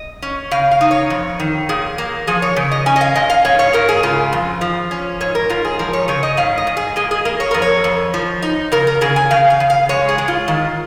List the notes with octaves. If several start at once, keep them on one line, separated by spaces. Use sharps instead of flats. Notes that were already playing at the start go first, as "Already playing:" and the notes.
Already playing: D#5
C#4
C#3 F5
F5
D#4
C#5
F2
D#3
A#2 G#4
A#3
F3 G#4
C#5
C#3
D#5
C#4 G#5
D#5
F5
A#2 D#5
F5
G#2 C#5
C#5
G#2 A#4
G#4
C#3 F4
F2
F3
C#4
G#2 C#5
A#4
G#2 F4
G#4
F3 A#4
C#5
C#3 C#5
D#5
G#2 F5
D#5
G#2
G#4
A#3 G#4
G#4
A#3 A#4
C#5
F2 A#4
C#5
F2
F3
D#4
C#3 A#4
A#4
C#3 G#4
G#5
C#3 F5
F5
C#3
F5
G#3 C#5
G#4
G#3
F4
D#3 F4